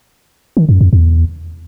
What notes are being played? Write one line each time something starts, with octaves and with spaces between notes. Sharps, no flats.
D#3
F#2
F2
E2